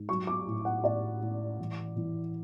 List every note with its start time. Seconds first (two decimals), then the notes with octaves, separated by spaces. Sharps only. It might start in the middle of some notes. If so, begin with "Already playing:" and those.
Already playing: G#2
0.09 F#3 C#6
0.27 D6
0.46 A2
0.65 F#5
0.84 A2 D5
1.21 A2
1.59 E3
1.96 E3